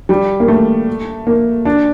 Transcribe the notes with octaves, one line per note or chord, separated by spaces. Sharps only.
G3
A#3
A3
A#3
D4